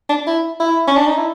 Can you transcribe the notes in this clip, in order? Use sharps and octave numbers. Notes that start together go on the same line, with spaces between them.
D4
E4
E4
C#4
D4
D#4
E4